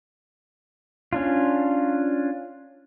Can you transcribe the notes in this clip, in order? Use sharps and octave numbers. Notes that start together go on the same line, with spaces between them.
C#4 D4 F4